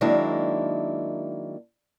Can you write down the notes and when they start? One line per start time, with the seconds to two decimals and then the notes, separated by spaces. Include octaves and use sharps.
0.01 D#3 F#3 G#3 A#3 D4 E4